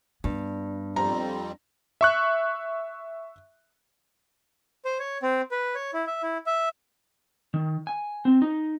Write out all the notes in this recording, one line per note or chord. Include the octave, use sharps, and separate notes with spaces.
G2 B3
F2 G3 C4 A#5
E5 C#6 F#6
C5
C#5
C4
B4
C#5
E4
E5
E4
E5
D#3
G#5
C4
D#4